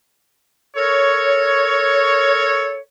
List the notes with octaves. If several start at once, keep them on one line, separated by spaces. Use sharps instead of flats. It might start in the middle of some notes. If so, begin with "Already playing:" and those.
A4 A#4 C#5